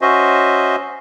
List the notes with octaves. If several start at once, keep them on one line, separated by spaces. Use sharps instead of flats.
C#4 F#4 C5 D#5 E5